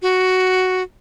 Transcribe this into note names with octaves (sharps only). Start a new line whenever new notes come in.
F#4